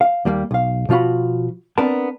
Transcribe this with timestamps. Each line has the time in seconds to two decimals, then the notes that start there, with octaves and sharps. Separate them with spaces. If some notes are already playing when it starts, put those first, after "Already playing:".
0.01 F5
0.25 D#2 G3 A#3
0.51 B1 F5
0.89 B2 F3 F4 F#4 B5
1.78 B3 C4 D4 A#4 D5 A5